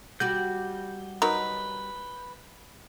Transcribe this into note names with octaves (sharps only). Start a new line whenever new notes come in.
G3 F#4 G4 G6
F#3 D#4 A#4 B4